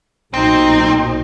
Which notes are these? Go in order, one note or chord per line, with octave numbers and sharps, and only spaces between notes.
B1 A#2 C4 D#4 F#4